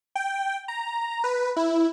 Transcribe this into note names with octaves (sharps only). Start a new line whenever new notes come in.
G5
A#5
B4
E4